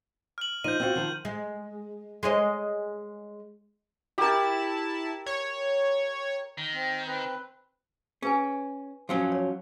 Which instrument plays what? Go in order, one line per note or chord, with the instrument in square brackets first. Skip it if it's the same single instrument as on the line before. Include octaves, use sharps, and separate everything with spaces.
[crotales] F6 F#7
[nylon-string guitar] F3 D#4 [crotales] G6 D#7
[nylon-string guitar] C4 F4 F#4
D#3 F3
[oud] G#3
G#3 C#5 D#5
[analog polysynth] E4 A5 [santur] G4 A#4
[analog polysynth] C#5
[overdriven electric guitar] D#3
[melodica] C4
C4 B4
[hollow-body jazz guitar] C#4 [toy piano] G#4 B4 G#5
[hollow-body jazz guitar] F3 F#3 C#4
[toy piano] C#5